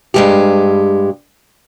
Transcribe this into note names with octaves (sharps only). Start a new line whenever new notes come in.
G2 G#3 G4